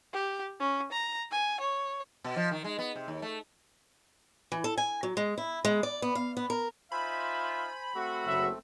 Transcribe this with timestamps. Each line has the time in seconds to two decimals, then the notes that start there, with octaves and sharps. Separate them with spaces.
0.13 G4
0.60 C#4
0.92 A#5
1.31 G#5
1.60 C#5
2.24 B2
2.36 F3
2.51 D#3
2.64 G#3
2.79 B3
2.96 C3
3.08 D#2
3.22 A3
4.52 E3
4.64 A4
4.78 G#5
5.03 F#3
5.17 G#3
5.38 E4
5.65 G#3
5.83 D5
6.02 B3
6.15 F5
6.37 B3
6.50 A#4
6.92 D#4 F4 C5 E5 G#5 B5
7.95 A3 C4 F#4 A4
8.25 F#1 F#3 E5